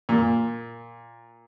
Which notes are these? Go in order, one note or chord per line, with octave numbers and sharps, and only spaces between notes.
A#2